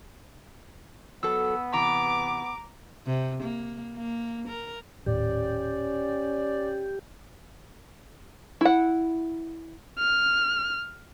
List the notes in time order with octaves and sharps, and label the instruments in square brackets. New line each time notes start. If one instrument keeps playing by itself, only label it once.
[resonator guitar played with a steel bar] F#3 A4 [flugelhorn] B3 [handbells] E6
[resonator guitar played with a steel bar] C3 E3 [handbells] A#5 [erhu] D6
[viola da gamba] C3
A#3
A#3
A#4
[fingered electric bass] D#1 A2 A3 [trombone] C#4 [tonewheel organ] G4 [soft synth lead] D5
[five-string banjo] E4 F#5
[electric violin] F6